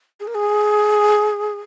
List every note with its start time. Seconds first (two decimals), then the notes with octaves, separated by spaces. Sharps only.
0.20 G#4
0.27 A#4
0.35 G#4